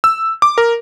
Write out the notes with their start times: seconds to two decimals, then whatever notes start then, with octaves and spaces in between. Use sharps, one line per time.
0.04 E6
0.42 D6
0.58 A#4